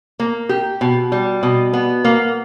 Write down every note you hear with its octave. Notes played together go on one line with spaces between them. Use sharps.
A#3
G4
B2
G3
B2
B3
A#3